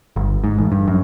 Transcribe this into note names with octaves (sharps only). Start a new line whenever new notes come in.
G1
G#2
A1
G2
F#2